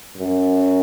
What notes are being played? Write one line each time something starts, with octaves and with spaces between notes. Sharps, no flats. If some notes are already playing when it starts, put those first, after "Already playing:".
F#2